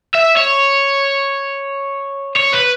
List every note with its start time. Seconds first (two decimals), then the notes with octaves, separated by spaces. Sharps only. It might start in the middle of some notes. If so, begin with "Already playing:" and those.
0.15 E5
0.37 C#5
2.37 C#5
2.53 B4